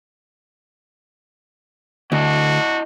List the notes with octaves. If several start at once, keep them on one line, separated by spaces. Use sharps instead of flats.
D2 E4 F#4 D#5 A5